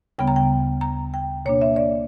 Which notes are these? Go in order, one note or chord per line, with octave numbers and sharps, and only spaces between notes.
D2 C#3 G3 B3 G5
A#5
G5
A#5
G5
B2 A#3 D4 C#5
E5
D5